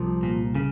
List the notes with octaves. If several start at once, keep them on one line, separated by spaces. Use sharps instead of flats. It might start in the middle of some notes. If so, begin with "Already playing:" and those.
Already playing: C2 F3
A#2
C#3